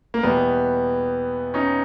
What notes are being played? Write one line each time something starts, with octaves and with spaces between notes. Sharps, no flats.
A#3
E2 B2 G3 B3
C#4 D#4